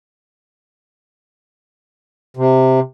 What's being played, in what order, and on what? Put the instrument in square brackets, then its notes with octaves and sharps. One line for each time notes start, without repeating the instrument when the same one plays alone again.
[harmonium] C3